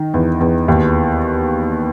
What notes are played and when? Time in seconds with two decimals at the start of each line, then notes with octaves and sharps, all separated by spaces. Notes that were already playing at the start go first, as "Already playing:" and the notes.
Already playing: D#3 D#4
0.14 E2
0.40 E2
0.68 D#2